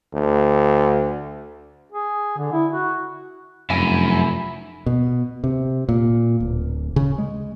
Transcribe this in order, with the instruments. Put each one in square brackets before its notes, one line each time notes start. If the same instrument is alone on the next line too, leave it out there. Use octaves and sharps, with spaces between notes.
[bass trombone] D2
[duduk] G#4
D3
E4
F#4
[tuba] F1 [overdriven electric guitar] F#2 [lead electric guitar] E4 G#5
[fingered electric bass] B2
C3
A#2
D1
C#3
G#3